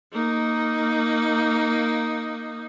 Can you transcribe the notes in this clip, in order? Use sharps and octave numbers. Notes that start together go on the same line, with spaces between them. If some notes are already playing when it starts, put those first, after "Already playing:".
A#3 D#4